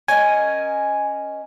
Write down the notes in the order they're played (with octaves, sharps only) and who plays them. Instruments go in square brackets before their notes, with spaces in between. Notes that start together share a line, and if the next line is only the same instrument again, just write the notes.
[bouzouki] C#4 A#4 D#5 [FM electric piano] G#5